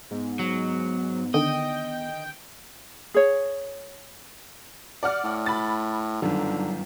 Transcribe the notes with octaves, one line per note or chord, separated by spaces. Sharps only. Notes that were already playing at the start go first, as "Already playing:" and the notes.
G#2 B3
F#3
D3 D#3 D#5 G5
G#4 C#5
D5 F#5 F6
A2
B5 A6
G1 F#2 D3 D#3